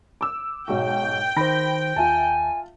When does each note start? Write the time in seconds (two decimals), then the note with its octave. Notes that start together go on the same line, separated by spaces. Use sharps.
0.21 D6 E6
0.68 B1 G#2 F#4 G5
1.37 D#3 C5 B5 A#6
1.96 D#2 F4 E5 G#5 A5